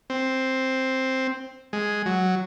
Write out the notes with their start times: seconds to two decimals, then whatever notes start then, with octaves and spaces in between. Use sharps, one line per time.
0.10 C4
1.73 G#3
2.06 F#3